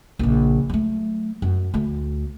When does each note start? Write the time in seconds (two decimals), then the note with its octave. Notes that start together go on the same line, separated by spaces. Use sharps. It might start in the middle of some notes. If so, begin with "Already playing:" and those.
0.19 A#1 C#3
0.70 F#3 A3
1.42 F#2
1.74 D2 A3